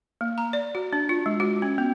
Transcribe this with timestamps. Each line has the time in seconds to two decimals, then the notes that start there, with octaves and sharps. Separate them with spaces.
0.21 A#3
0.38 A#5
0.53 D5
0.75 F#4
0.93 D4
1.09 F4
1.26 G#3
1.40 F#4
1.62 C#4
1.78 B3